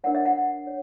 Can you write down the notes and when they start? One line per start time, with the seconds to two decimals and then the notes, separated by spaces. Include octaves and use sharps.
0.04 D4 A#4 C#5 F#5
0.15 E5
0.26 F#5
0.67 C#5